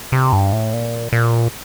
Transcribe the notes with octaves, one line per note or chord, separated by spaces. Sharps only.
C3
G2
A2
A#2
A#2